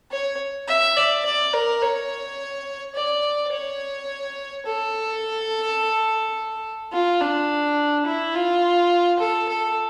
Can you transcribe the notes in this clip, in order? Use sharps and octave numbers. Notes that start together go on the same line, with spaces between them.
C#5
E5
D5
D5
A#4
C#5
D5
C#5
A4
F4
D4
E4
F4
A4
A4